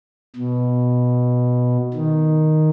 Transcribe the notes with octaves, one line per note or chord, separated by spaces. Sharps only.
B2
D#3